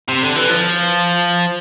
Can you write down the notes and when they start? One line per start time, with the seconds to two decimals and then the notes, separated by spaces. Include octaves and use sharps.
0.09 C3
0.23 D3
0.36 E3
0.50 F3